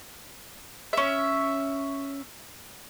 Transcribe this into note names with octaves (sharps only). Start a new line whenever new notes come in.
C#4 E5